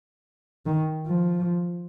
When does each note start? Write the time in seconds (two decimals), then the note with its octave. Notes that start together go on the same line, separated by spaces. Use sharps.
0.66 D#3
1.07 F3